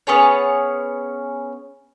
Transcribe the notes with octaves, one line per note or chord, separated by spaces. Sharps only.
B3 C#4 G#4 C#5